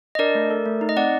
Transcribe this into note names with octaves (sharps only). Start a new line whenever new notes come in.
D#5
D4 A#4 D5
A3
A4
A3
D#4
D#5
C4 D5 F#5